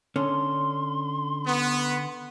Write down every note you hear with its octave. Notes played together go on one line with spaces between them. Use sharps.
D3 C#4 C6
B3